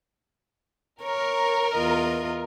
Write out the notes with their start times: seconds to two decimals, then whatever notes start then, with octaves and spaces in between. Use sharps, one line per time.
1.03 A#4 C#5
1.74 E2 F4 D#5